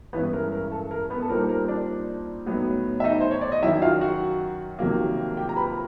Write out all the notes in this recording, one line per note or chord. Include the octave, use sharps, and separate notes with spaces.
G2 E3 G#3 B3 C#4 B4
A#4
A#4
A4
A#4
B3 B4
A4
A#2 G3 C4 D#4 A#4
A#4
D4 D5
A2 F#3 B3 D#4
E5
D#4 D#5
C5
C#5
D5
D#5
F#2 D#3 F#3 E4 E5
F4 F5
F#4 F#5
F2 C3 D#3 F#3 A#3
G4 G5
A#5
B4 B5